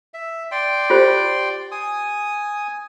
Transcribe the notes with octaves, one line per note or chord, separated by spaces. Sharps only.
E5
D5 G5 C6
F4 G4 C5
G#5 D#6